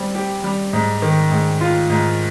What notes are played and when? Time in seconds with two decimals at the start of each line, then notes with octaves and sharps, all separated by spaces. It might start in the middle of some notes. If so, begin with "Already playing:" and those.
Already playing: G3 C4
0.15 G4
0.44 G3
0.73 G#2
1.02 D#3
1.32 G#2
1.61 F4
1.90 G#2